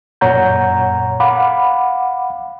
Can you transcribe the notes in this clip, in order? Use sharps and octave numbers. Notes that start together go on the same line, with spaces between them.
F#2 A#2 C#5 F#5 A#5 G6
F5 F#5 B5 D6